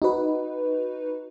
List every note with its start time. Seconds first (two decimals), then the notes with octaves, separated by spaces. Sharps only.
0.02 D#4 F#4 B4